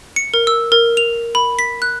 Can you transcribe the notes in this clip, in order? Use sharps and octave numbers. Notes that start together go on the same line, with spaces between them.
C#7
A#4
E6
A#4
F7
B5
B6
F#6